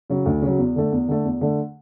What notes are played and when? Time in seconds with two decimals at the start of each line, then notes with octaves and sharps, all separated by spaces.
0.10 C#3 F#3
0.25 D2
0.42 C#3 F#3
0.58 E2
0.76 D3 A3
0.92 E2
1.08 D3 A3
1.24 E2
1.41 D3 A3